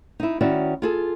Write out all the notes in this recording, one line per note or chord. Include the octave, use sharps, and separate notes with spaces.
D#4 E4
D#3 C#4 E4 F#4 D5
F4 G#4 A4